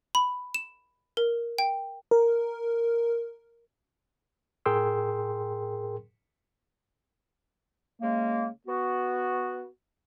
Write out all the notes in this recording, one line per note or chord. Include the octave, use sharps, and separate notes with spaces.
B5
E7
A#4
G5
A#4
A2 G#4 A#4 G5 C6 E6
C#3 G#3 A#3
B3 F#4